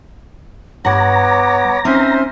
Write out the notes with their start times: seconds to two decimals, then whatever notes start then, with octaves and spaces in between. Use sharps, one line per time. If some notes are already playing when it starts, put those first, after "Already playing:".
0.85 G2 B3 C#5 F#5 A#5 D6
1.85 C4 C#4 D#4 C5 E5 F6